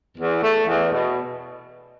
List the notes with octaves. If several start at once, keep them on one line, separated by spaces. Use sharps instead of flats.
E2
A3
E2
B2